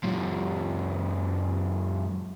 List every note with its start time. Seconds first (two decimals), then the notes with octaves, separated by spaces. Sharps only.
0.04 F#2 A#2